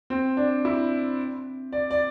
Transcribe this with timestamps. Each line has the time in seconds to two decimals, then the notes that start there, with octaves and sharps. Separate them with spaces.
0.10 C4
0.37 D4
0.65 E4
1.73 D5
1.91 D5